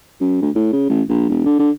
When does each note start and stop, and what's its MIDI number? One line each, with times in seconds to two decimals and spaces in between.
0.20 0.40 42
0.42 0.50 38
0.55 0.69 45
0.73 0.87 49
0.89 1.02 33
1.09 1.28 34
1.29 1.42 28
1.45 1.56 50
1.59 1.71 50